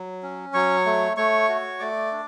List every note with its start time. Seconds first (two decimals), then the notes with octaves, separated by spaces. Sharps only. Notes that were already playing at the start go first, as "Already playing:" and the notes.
Already playing: F#3
0.23 C#4
0.54 F#3 C#5 C#6
0.85 A3
1.17 A3 C#5 C#6
1.49 F#4
1.80 A3 D5 D6
2.12 D4